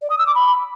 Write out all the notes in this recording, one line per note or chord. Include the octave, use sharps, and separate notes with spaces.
D5
D#6
E6
D6
B5